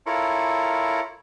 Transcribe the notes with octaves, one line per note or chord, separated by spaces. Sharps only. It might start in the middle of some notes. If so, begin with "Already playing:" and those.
E4 F4 A4 A#4 C#5